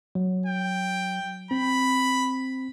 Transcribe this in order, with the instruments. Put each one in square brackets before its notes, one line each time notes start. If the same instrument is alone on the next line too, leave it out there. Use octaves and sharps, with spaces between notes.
[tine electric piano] F#3
[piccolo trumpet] G5
[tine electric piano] C4 [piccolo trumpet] B5